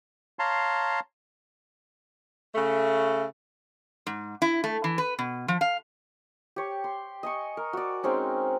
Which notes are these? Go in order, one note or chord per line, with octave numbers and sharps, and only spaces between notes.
C#5 F5 A5 A#5 C6
C#3 A3
G#2
E4
A3
E3
B4
B2
F3
F5
G4 C#5
C6
D#5 G#5 C#6
A#4
F#4 D5
G#3 C4 C#4 D#4